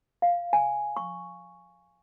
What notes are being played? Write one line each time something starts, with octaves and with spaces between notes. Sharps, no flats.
F5
G#5
C#6